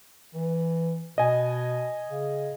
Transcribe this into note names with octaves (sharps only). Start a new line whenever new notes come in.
E3
B2 D#5 G#5
C#3